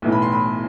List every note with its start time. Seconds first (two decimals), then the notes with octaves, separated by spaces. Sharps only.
0.02 B1 A2 E3 B3
0.12 B5
0.22 C6
0.32 B5